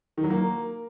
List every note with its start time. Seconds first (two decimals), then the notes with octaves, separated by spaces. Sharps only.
0.17 D#3
0.24 F#3
0.30 A#3